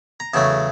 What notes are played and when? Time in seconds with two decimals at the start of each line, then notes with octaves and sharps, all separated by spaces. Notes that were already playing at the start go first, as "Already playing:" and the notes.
0.20 A#5
0.34 E2 C#3 F#3 A3 A5